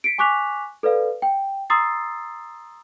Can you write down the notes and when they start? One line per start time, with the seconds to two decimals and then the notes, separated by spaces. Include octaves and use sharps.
0.04 B6 C#7 D7
0.18 G#5 C#6 D6 F#6 B6 F7
0.83 A4 B4 D5 F5
1.22 G5
1.70 A#5 C6 D#6 E6 A6 C7